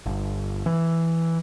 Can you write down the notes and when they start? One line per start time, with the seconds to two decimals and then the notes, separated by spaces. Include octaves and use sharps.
0.06 G1
0.66 E3